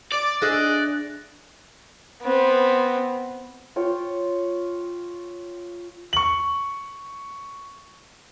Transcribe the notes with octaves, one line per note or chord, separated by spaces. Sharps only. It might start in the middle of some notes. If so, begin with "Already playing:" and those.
D5 D6
D4 G#4 D#5 E5 F#6
B3 C4
F4 C#5 G5
C#6 F#7